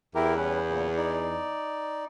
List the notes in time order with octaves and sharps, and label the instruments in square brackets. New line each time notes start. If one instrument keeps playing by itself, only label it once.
[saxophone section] E2 [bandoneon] E4 G4 A#4
[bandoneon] G3 C#4 B4
A#2 C#3
D#4 D5